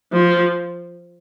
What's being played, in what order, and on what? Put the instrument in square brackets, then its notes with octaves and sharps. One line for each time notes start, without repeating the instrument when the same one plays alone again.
[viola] F3